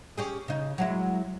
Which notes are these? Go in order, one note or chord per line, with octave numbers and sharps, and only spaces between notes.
C#4 G4 G#4
C#3 D#4
F#3 G#3 E4